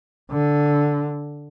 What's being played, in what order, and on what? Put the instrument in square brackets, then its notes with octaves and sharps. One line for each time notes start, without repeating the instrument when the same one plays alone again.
[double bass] D3